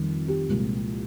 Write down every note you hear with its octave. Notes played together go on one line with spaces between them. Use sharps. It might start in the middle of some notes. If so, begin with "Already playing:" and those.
Already playing: F2 D#3 G3
G4
C2 A#2 F3 G#3